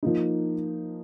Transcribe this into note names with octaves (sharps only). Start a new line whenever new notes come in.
F3 A#3 D#4